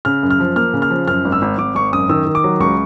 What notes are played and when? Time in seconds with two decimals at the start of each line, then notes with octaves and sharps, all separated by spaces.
0.05 C#3 F6
0.23 F#2
0.30 F6
0.40 F3
0.56 A#3 F6
0.74 C#3
0.82 F6
0.90 F3
1.07 F#2 F6
1.25 G#1
1.32 E6
1.42 G#1
1.58 G#1 D6
1.75 G#1 C#6
1.92 F#2 D#6
2.09 D#3 E6
2.26 D#3
2.35 D6
2.44 F#3
2.60 C#2 C#6